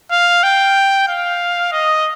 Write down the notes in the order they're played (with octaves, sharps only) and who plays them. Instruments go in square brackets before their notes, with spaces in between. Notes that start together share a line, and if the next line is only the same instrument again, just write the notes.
[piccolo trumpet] F5
G5
F5
D#5